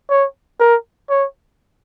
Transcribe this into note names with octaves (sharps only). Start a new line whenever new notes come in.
C#5
A#4
C#5